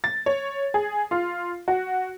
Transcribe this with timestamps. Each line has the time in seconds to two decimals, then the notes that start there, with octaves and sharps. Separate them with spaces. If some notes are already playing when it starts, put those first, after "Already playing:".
0.04 A6
0.26 C#5
0.74 G#4
1.11 F4
1.68 F#4